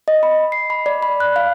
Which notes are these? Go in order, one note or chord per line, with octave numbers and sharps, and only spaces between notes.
D#5
B5
C7
B5
D5
B5
F#6
F5